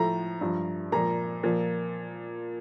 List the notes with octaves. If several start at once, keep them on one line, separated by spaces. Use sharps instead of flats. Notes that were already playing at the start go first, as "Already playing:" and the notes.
Already playing: A2 F3 A#5
G2 F3
A#2 F3 A#5
A#2 F3